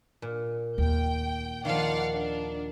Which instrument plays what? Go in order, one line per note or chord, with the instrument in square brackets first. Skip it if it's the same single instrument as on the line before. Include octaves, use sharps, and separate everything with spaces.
[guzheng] A#2
[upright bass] D#2 [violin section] G5
[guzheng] D#3 F3 [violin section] D5 F5 F#5
[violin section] D4